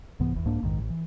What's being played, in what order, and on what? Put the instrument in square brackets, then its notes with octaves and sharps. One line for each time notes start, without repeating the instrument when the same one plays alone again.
[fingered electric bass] C2 G#2 E3 B3
F#1 E2
C2 G#2 A#3 D4
A#1 F2 G#2 D#3
A1
E3